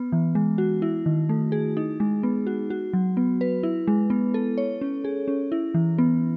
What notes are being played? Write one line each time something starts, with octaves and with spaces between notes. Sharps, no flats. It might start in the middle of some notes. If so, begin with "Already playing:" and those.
Already playing: B3
E3
G#3
F#4
E4
D#3
A3
G#4
D#4
G#3
B3
F#4
F#4
F#3
B3
B4
E4
G#3
B3
A4
C#5
C#4
G#4
C#4
E4
E3
B3